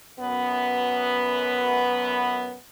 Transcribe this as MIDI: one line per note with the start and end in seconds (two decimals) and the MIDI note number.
0.19 2.55 42
0.19 2.55 59